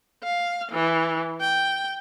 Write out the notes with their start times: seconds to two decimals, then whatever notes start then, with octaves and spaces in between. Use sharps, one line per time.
0.24 F5
0.72 E3
1.41 G5